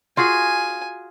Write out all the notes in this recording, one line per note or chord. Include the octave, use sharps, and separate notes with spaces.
F4 F#4 G#4 G#5